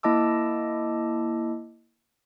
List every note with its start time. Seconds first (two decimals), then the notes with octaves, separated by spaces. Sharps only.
0.03 A#3 E4 D#5 A5 D6 E6